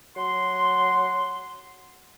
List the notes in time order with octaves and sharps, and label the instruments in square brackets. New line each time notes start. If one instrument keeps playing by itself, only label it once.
[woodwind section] F#3 F#5 C6